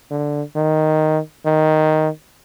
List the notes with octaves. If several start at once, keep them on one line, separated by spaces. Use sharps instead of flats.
D3
D#3
D#3